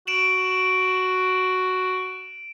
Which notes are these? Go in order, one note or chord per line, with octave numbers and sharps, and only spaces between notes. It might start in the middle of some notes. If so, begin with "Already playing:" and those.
F#4 D7 E7 F#7